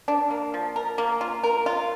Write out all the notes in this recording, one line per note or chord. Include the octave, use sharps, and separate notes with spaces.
D4
A#3
F3
A#4
A#3
F4
A#4
F4